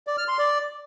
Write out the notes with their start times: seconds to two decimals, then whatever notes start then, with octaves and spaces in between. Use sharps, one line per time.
0.07 D5
0.18 F6
0.28 C6
0.38 D5